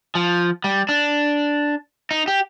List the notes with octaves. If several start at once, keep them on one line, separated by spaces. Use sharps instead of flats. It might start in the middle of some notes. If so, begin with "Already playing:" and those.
F3
G3
D4
D#4
G4